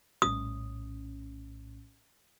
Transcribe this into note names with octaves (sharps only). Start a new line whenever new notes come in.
A#1 A2 C#4 D#6